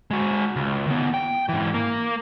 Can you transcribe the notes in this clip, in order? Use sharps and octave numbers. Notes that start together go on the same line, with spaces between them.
G#3 F#4
C#2
D#3 B3
G5
G#2 E3
A#3